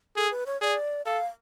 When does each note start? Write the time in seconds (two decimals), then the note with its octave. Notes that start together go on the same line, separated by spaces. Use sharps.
0.16 G#4 A4
0.31 B4
0.46 C#5
0.62 G#4 D5
1.06 A4 F5